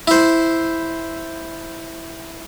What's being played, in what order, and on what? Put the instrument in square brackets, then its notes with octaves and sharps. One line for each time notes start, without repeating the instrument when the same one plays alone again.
[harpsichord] E4 C5